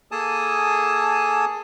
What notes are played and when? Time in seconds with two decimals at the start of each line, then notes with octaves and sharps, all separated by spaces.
0.11 A#3 G#4 A4 G#5 A5 D#6